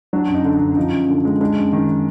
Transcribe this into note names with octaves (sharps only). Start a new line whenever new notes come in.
F#3 D4
F#2
D#4
D3
F#2 D#4
F3 D#4
F#2
D3
G#3
G#3 D4
F#2
D#3